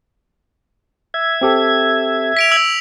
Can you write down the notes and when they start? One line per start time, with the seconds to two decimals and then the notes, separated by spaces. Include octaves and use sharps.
1.14 E5 G#6
1.41 C4 G4 A4
2.37 B6 D7 F7
2.52 E6 F#7